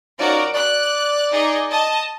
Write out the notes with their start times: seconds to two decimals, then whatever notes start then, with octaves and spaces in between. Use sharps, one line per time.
0.19 F3 C#4 D#4 F#4 A#4 D5
0.54 D5 F#6
1.33 D#4 G#4 D#5
1.71 D#5 A5